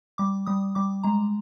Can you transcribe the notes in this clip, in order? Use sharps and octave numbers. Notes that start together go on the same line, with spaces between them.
G3 D6
G3 D#6
G3 D6
G#3 A#5